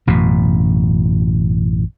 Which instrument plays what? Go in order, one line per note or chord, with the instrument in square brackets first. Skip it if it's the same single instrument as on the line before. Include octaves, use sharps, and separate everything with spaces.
[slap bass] A1 F#2 B2